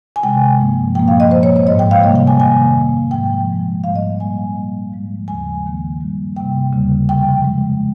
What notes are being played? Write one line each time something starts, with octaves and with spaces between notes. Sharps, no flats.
G#5
C3 D#3 G#3 G5
G2 F3 A#3
A#2 F3 A#3 G5
F5
D#5
A#2 G#3 C5
C#5
C#5
G#2 F3 G#3 D#5
G5
F5
C3 G3 A#3 D#5
G5
G#5
F2 C3 D#3 A#3 G#5
F2 C3 G3 A#3
G#2 F3 G#3 G5
A#2 F3 G#3
G#2 G3 A#3 F5
D#5
A#2 G3 A#3 G#5
A#2 G3 A#3
G#2 F3 G#3
D#2 C#3 F3 G#3 G#5
D#2 D#3 A#3
G2 G3 A#3
C3 G3 A#3 G5
D#2 C#3 G3 A#3
F2 C3 F3 G5
F2 C#3 G#3